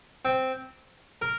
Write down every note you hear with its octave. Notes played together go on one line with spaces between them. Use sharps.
C4
A#4